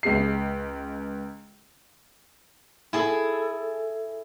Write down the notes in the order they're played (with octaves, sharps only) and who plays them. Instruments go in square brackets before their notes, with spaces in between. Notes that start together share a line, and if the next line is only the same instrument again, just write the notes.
[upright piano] C#2 G#3 C7
[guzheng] E4 G#4 A4